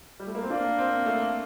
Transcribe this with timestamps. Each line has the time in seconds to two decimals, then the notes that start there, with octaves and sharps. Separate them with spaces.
0.20 G3
0.27 A3
0.35 A#3
0.42 C4
0.50 A#3 D4
0.78 C4
1.06 A3